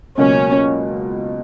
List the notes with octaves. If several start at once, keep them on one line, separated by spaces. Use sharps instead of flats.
C#2 B2 F#3 A#3 C#4